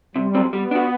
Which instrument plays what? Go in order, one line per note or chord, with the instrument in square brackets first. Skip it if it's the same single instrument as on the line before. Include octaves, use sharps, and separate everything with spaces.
[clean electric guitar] C3 [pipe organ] G3
[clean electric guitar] F#3 C4
[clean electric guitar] G3 [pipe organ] B3
[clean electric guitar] D4 F#4